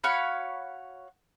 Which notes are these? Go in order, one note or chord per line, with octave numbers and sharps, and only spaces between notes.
F#4 C#5 F5 B5